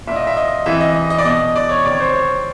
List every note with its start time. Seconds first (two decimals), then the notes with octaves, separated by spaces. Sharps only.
0.07 A#2 E5
0.16 D#5
0.27 E5
0.37 D#5
0.66 C3 E3 E5
0.81 D#5
0.96 D#5
1.10 D#5
1.18 D5
1.25 B2 D#5
1.56 D5
1.69 C#5
1.85 C3 D#3 D5
1.93 C#5
2.00 C5
2.14 C#5